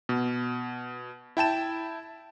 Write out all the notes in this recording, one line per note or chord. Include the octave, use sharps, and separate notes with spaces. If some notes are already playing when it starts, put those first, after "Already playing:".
B2
E4 G5 A5 E7